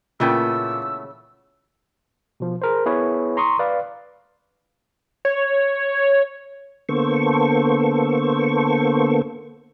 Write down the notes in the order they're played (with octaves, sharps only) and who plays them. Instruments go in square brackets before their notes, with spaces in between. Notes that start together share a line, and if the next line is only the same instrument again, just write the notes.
[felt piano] A#2 [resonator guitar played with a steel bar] C#3 C#4 G5 [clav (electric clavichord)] E3 A3 B3 [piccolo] E6
[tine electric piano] B2 F3
G#4 A#4 C5
B3 E4 G#4 B4 C#5
A#5 C6 C#6 D#6
B4 D5 F5
[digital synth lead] C#5
[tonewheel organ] D3 A#3 B3 A4 C5 C#6